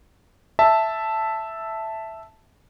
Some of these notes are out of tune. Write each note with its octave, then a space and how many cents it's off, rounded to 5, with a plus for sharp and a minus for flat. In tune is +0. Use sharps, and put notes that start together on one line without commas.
E5 +0 A5 +0